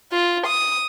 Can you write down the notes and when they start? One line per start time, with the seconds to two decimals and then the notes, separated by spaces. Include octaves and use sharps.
0.12 F4
0.47 D#6